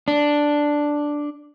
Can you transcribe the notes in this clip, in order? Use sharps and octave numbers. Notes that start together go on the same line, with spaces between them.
D4